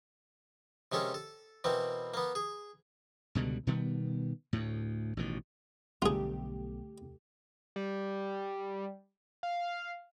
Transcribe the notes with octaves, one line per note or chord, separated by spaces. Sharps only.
C3 G#3 A#3 C#4 A4
A4
B2 E3 A#3 C4
A#3 B3
G#4
C#2 B2 D3 G3
B2 D#3 G3 B3
D2 A2
A1 B2 D#3
B1 D3 G3 A3 F4 G4 G#4
G3
F5